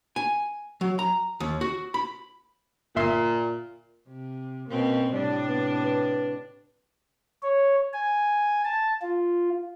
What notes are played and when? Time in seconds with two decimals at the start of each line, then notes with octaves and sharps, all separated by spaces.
0.16 G#5
0.81 F#3
0.99 A#5
1.40 D#2
1.61 F#4
1.94 B5
2.96 G1 A#2 E5 C6
4.08 C3
4.69 B2 A#3 C4 C#4
5.13 A2 C3 G3 D4
5.48 B3
5.84 B4
7.43 C#5
7.93 G#5
8.64 A5
9.02 F4